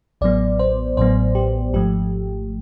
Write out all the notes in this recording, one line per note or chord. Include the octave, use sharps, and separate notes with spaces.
A1 A2 F#3 B3 D5
C5
A1 A2 F#3 B3 C5
G4
G#1 G#2 F3 A3 G4